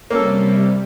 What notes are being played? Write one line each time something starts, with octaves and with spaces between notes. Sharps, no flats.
C3 G3 A#3 C#4 A4